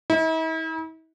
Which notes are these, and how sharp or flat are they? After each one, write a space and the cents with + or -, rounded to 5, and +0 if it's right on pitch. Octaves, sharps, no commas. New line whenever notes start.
E4 -45